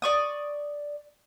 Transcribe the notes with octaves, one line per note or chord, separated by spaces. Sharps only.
D5 C#6 D#6